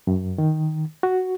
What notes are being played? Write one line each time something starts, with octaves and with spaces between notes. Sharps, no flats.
F#2
D#3
F#4